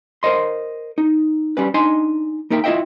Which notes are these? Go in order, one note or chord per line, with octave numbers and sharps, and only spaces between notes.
A#4 C5 D#5 C6
D#4
G3 C#4 B4
D4 D#4 D#5 G#5 A#5 C6
A#3 D#4 A#4 E5 G5
E4 F4 D#5 E5 G5